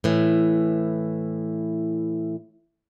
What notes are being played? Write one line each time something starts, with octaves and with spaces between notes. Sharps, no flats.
A2 E3